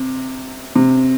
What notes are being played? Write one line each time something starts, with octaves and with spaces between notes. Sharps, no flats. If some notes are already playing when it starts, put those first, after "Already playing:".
Already playing: C3
C3